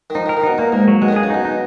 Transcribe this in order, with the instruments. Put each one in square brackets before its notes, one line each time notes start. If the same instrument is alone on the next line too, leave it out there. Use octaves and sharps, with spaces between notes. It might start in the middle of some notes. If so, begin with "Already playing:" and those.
[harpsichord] D#3
[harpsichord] F3 [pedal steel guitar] D#4
[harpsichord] D#3
[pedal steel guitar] A#4
[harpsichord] D#3
[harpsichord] B2 [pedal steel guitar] D#4
[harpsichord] A#2 [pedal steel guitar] A#3
[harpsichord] G#2 [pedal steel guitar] A#3
[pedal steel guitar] F#3
[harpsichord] B2 [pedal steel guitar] G#3
[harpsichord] D#3
C#3
[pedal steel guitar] G#4
[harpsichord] C#3
[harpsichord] B2 [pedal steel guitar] D#4
[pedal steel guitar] D#4